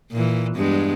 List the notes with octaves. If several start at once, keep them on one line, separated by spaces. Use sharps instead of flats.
A#2 E3
E2 G2 G#3